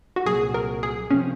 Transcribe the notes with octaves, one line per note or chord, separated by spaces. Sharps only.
F#4
C2 A#2 F#3 G#4
A#4
G#4
C3 F3 C4 C#4